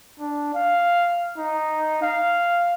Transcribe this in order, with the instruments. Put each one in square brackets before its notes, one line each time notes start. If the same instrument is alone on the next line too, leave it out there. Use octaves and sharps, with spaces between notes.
[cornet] D4
F5
D#4
F5